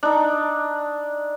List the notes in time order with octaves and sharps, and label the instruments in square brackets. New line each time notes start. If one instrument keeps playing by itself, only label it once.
[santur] D4 D#4